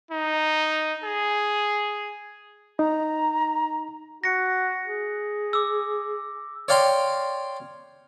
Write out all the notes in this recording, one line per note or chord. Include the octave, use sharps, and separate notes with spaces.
D#4
G#4
D#4 A#5
F#4 A#6 C#7
G#4
D6 E6
C#5 D5 F5 G5 A#5 C6